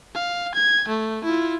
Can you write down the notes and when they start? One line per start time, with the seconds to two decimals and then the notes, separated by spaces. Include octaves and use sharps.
0.15 F5
0.55 G#6
0.88 A3
1.24 E4 F4